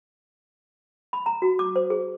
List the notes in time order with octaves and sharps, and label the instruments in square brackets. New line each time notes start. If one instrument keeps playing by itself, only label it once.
[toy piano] B5
A#5
F#4
D6
C5
G#4